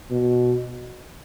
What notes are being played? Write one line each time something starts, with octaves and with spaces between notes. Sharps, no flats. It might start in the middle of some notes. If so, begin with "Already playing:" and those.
B2